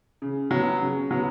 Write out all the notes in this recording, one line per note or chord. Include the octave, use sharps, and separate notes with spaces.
C#3
F#3 B3
C#3
F#3 B3